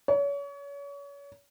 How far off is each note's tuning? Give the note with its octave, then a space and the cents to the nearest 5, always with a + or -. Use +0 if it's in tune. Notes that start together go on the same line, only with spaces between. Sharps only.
C#5 +35